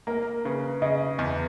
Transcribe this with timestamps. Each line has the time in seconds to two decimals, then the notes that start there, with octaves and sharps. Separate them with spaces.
0.07 A#3 A#4
0.45 C#3 B4
0.82 C#3 D#5
1.19 E2